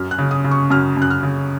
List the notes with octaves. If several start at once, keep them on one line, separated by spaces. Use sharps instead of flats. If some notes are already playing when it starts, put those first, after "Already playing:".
Already playing: F#2 F6
F#6
C#3
D#6
C#3
C#6
F#2 F6
F#2 F#6
F6
C#3